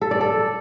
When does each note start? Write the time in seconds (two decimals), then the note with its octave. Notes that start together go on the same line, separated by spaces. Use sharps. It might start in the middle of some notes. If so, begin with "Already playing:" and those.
0.01 A4
0.11 D5
0.21 A4